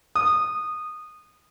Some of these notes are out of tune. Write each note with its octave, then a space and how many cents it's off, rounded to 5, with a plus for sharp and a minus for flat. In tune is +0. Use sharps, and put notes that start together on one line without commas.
D#6 -15